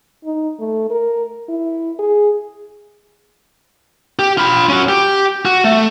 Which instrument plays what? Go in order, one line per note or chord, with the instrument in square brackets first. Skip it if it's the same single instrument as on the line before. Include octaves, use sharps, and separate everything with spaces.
[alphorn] D#4
A3
A#4
E4
G#4
[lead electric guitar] G4
F4 B5
C#4 F#4
G4
F#4
A3